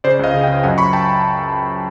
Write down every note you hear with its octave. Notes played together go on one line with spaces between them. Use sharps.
C#3 C5 D5
C#2 D#5 F5
C#3
F5 G5
C#2
F#2 F#5 G#5
F#2 B5 C#6
G5 A5